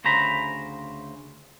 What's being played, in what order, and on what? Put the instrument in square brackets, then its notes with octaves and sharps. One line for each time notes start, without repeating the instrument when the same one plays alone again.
[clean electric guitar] D2 C#3 C5 A#5 B5